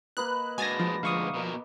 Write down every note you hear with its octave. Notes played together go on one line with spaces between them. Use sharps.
A#3 B4 D#5 F#6
G#3 D4 F#4 G#5 A6 A#6
F3
D2 G#3 F5 C#6 D#6
B2 A#4